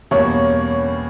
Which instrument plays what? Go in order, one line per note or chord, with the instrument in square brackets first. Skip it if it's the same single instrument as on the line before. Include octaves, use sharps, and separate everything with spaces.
[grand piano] E2 B2 G3 A#3 [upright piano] C#5